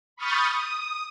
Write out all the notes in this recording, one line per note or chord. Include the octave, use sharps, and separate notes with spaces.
B5 C#6 D#6 F6 G6 A6
D#6